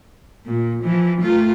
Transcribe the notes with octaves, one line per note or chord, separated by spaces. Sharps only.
A#2
E3 F3
A3 F4